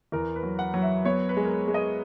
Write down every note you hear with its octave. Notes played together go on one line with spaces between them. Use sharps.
E2 A#4
B4
F#3
F#5
F#3
E5
B3 C#5
B4
G#3
A#4
B4
G#3
D#5